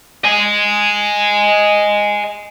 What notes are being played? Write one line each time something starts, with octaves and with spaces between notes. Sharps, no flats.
D#5 G#5